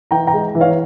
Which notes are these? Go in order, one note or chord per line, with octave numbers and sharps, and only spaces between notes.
E3 G5 A#5
G5 A#5
G#3
E3
C#5 F5